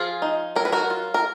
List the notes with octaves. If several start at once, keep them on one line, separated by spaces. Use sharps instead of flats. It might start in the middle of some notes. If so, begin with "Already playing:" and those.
Already playing: F3 F4 G#4
D#4
F#3 A#4
B4
F#4 A#4
F4
A#4